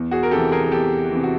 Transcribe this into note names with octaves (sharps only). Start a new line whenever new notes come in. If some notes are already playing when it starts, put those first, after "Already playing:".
Already playing: E2
F#4 G#4
A#4
C3 E3 G4 A4
G#4 A#4
A#4
E2 G4 A4
C3 E3
F#4